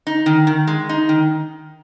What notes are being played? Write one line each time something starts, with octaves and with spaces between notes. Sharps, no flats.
D#4
D#3
D#3
G#3
D#4
D#3